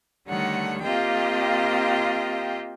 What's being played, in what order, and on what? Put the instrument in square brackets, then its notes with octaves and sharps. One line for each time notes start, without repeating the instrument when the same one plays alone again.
[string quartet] D3 D#3 G3 A3 C#5 F#5
A#3 C4 F4 G4 D#5 G5